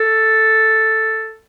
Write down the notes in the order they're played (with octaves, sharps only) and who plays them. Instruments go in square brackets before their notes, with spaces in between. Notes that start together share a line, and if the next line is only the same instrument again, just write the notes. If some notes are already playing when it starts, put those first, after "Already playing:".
Already playing: [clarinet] A4